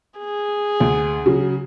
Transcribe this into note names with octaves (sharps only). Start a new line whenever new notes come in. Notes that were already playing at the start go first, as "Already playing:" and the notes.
G#4
D2
C#3 F#3